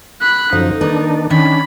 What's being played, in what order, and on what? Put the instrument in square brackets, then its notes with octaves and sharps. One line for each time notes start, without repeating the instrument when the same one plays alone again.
[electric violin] B5 F#6
[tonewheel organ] F#2 F3 [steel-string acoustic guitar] D3 [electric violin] D#4
[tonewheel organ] D#3 D4 [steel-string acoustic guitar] A#3 A#4 B4
[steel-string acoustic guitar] D#3 [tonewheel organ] C#4 D4 [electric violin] B5